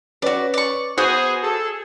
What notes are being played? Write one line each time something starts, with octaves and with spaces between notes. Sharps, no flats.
C#4 F#4 B4 D5
D5 C#6
B3 F#4 G#4 C5 F#5 G6
G#4 A4